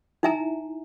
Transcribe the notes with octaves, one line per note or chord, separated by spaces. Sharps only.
D#4 E4 E5 G#5 A#5